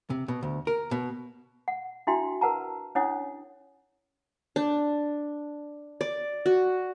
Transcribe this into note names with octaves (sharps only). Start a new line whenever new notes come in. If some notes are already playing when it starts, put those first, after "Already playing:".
C3
B2
D2
A#4
B2
F#5
D4 E4 F#4 E5 G5 C6
A#4 B4 F#5 A5 A#5
C#4 D4 E4 C#5 F#5 D#6
D4
D5
F#4